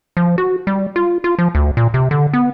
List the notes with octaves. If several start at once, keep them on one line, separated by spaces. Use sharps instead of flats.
F3
F#4
G3
F4
F4
F3
D2
A#2
C3
D3
B3